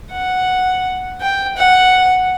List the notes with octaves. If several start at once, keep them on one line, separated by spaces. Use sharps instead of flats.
F#5
G5
F#5